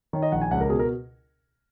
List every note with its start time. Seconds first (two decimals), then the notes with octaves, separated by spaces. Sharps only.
0.13 D#3 C#5
0.22 D#5
0.32 A#1 F#5
0.41 G#5
0.51 C#2 F#5
0.61 A#4
0.70 B2 G#4
0.79 A#4